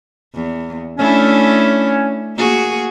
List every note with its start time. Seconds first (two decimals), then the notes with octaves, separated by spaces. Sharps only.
0.34 E2
0.98 A3 C#4 D4 E4
2.36 A#3 F#4 G#4